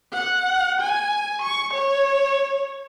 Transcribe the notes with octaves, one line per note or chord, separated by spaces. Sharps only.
F#5
G#5
C#6
C#5